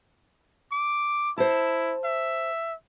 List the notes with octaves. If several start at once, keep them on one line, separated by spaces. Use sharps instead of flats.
D6
E4 C5 A5
E5